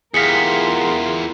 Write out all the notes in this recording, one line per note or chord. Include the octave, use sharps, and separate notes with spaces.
E2 F4 G4 G#4 A#4 F5 B6 C#7